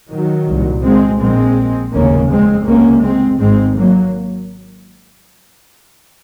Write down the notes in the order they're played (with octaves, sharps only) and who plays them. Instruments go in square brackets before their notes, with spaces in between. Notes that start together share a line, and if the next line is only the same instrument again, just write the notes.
[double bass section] D#3 F#3
C2 A#2
G#3 C4
A#1 A#2 G#3 C4
F1 D#2 C#3 A#3 C#4
G#3 C4
C#2 C3 A#3 C#4
G#3 C4
G#1 G#2 G#3 C4
F#3 A#3